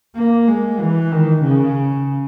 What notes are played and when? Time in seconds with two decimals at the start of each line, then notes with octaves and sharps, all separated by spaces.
0.16 A#3
0.48 G#3
0.80 E3
1.12 D#3
1.45 C#3